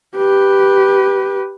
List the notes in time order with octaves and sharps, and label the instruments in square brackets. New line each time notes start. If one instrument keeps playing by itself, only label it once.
[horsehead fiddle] G4 B4